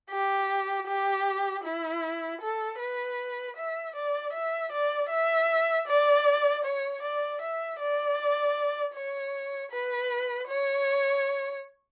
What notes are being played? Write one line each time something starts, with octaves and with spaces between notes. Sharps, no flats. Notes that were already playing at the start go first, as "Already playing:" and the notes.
G4
G4
E4
A4
B4
E5
D5
E5
D5
E5
D5
C#5
D5
E5
D5
C#5
B4
C#5